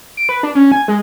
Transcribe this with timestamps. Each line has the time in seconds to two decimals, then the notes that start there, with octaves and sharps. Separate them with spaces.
0.17 D7
0.29 B4
0.43 D4
0.55 C#4
0.72 G#5
0.88 G#3